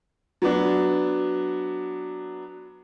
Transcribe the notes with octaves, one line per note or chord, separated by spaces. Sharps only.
F#3 B3 D4